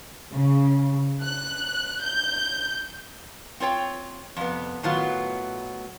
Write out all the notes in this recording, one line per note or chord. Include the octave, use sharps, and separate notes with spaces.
C#3
F#6
G6
C4 F4 C#5 G5
F2 C3 B3
A2 D#3 F#3 B3 F4